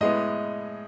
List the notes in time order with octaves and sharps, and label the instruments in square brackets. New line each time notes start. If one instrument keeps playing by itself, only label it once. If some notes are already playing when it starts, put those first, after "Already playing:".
[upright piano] A2 G#3 B3 D#5